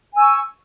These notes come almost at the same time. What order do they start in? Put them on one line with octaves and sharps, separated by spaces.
G#5 E6 C#6